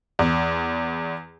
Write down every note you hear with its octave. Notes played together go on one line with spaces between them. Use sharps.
E2